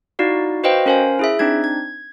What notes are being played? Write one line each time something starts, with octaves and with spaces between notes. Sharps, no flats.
D#4 E4 F#4 D5 F5
F#4 B4 C5 D#5 F5 G5
C#4 A#4 C5 F5 G#5
E4 G#4 E5
C4 D4 D#4 G#6
G#6